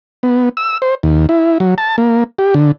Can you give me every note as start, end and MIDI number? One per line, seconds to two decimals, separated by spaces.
0.23 0.49 59
0.57 0.78 88
0.82 0.95 72
1.03 1.26 39
1.29 1.58 64
1.60 1.74 54
1.78 1.96 81
1.98 2.24 58
2.39 2.54 67
2.54 2.71 50